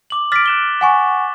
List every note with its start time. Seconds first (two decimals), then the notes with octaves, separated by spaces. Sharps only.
0.10 D6 F#7
0.32 D6 F6 A6 B6 D7
0.46 F#6 E7 G7
0.81 F#5 G#5 C#6